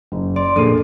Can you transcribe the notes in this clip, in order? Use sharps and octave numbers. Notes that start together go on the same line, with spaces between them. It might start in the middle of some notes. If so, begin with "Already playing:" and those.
F#1
D5 C6
F2 A#2 A#3 D4 G#4 A4 D#7